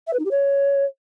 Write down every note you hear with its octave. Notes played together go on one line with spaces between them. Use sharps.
E5
B4
D#4
G4
C#5